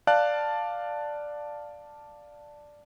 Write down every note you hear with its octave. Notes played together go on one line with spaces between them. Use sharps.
D5 F5 A5 F#6